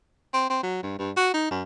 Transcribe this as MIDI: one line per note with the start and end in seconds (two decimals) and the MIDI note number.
0.33 0.48 60
0.50 0.59 60
0.63 0.80 54
0.83 0.96 43
0.99 1.11 43
1.16 1.31 66
1.33 1.49 63
1.51 1.63 42